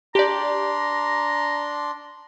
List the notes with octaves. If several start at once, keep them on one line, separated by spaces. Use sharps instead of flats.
D4 G4 D5 A#5 C6